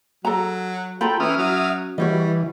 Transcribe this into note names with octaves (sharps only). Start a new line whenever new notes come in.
F#3 A4 A#5
F4 A4 G5 A#5 B5
E3 C#4 E5 D#6 F6
F#3
E3 G3 F#4 C#5 D#5